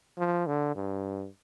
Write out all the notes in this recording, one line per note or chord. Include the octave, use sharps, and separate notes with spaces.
F3
D3
G2